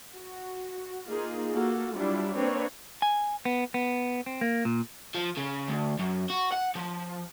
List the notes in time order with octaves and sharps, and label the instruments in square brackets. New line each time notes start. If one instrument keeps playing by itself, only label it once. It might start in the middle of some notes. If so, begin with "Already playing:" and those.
[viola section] F#4
A#3 D#4 F4 G#4
A#3 F#4 A4
F#3 G3 D4 E4 F4
A#3 C4 D4 B4 C#5
[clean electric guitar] G#5
B3
B3
C4
A#3
A#2
[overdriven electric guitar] F3
C#3
D2
F#2
F#4
F#5
F3